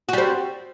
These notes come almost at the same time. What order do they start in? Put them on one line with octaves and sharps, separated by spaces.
F#4 G3 C4